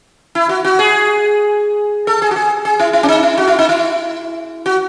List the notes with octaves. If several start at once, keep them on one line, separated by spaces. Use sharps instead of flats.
E4
F#4
F#4
G#4
A4
G#4
F#4
G#4
G#4
E4
E4
C#4
D#4
E4
F#4
E4
D#4
E4
F#4